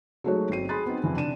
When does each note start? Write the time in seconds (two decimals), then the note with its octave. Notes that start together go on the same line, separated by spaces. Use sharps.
0.24 F#3 G#3 A3 D#4 F#4 C#5
0.50 G1 C4 C7 D#7
0.69 G#4 B5 C6 F#6 A6
0.86 B3 C4 D#4
1.04 F2 E3
1.16 C3 D4 D#7 E7